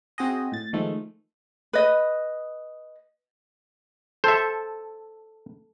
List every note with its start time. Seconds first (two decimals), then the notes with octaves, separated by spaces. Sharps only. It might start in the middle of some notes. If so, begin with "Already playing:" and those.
0.18 C4 F#4 G#4 D#5
0.52 A2 A6
0.73 D#3 F3 G#3 A3
1.73 B4 D#5
4.24 A4 C5 E5